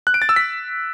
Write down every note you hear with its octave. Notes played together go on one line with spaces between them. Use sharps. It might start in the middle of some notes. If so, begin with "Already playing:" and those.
F#6
D7
A6
E6
B6